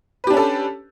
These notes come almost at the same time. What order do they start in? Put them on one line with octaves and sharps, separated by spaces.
B4 G4 D4 C#4 A4